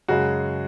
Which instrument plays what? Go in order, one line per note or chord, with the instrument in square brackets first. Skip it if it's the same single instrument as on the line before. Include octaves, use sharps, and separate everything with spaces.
[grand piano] F#2 C#3 G#3 [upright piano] F#4